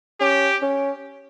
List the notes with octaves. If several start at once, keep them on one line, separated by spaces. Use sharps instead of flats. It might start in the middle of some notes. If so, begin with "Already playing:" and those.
C#4 G4
C#4